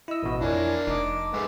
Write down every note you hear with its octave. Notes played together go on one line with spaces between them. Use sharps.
E4 D#5 E6
A1 B2
F2 A#3 D4 E4 C#5 G#5
F1 D#4 D#5 D6
G#2 G#3 A3 B3